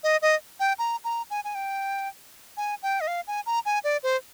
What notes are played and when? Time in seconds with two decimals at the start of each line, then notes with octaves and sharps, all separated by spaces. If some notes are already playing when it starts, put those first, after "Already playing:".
0.03 D#5
0.22 D#5
0.60 G5
0.79 A#5
1.04 A#5
1.30 G#5
1.44 G#5
1.55 G5
2.57 G#5
2.83 G5
3.01 D#5
3.07 F5
3.27 G#5
3.46 A#5
3.66 G#5
3.84 D5
4.03 C5